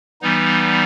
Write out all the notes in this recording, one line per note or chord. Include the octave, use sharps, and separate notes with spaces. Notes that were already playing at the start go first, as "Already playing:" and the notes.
E3 G3 B3 D#4